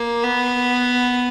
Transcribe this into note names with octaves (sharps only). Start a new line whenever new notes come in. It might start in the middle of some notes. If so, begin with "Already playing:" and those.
Already playing: A#3
B3